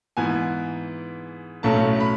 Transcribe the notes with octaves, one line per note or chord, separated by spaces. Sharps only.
G#2 E3 B3 G#5
B1 A2 F#3 A3 C#4 A5
B5